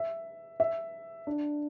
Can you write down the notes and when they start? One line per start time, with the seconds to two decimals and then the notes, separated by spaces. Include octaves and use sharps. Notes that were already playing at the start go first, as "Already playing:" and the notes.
Already playing: E5
0.60 E5
1.27 D4